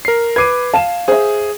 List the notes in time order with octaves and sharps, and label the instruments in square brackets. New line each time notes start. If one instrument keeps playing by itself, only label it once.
[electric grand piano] A#4 C7
[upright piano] B4 D6 [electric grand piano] G#6 C7 D#7
[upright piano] F5 E7 [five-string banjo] A5
[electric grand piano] G#4 [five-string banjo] C5 E5